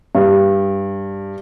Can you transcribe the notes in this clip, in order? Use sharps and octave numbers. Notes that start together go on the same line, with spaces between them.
G2